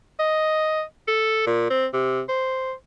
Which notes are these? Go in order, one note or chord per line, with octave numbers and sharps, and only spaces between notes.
D#5
A4
A#2
C4
C3
C5